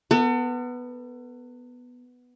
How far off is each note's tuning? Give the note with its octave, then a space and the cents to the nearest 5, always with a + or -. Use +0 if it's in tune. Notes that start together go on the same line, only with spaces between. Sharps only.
B3 +0 A4 +40